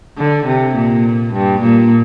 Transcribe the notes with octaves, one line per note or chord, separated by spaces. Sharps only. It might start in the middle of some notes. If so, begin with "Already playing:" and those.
D3
C3
A#2
G2
A#2